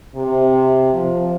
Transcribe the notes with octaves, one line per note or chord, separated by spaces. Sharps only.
C3
F3